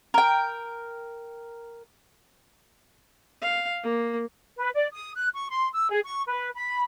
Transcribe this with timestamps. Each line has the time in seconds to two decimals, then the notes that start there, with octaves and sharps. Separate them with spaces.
0.14 A#4 G5
3.42 F5
3.83 A#3
4.58 B4
4.73 D5
4.93 D#6
5.16 F#6
5.34 C#6
5.50 C6
5.74 E6
5.90 G#4
6.04 C#6
6.27 B4
6.54 B5